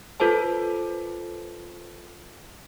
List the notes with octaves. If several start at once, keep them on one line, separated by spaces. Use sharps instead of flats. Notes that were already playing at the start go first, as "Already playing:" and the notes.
F4 A4 B4 C5 A5